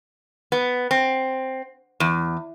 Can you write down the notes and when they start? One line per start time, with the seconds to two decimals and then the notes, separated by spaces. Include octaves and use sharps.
0.52 B3
0.91 C4
2.00 E2